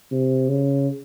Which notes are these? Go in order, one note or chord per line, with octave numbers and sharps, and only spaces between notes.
C3
C#3